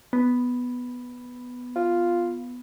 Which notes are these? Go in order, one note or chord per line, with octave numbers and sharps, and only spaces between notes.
B3
F4